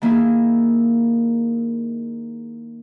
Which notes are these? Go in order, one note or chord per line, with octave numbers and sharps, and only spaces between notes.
D#3 A#3 D#4 E4 G#4